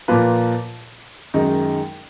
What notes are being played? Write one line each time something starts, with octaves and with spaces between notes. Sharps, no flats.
A#2 F3 A#3 F4 B4
F#2 D#3 G#3 D#4